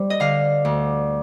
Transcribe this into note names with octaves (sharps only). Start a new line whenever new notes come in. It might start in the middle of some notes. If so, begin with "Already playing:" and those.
Already playing: G3 C5
D#5
D3 F5
D2